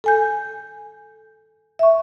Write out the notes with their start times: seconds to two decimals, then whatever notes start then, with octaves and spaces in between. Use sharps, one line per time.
0.04 A4 G#5 G6
1.79 E5 C#6